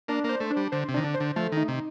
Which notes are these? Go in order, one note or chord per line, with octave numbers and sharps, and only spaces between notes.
A#3 D4
A#3 C5
A3
D4
G3
D3 C5
C3
D#3 D4
D3
C5
D3
F3 A3
D#3
D#4
C3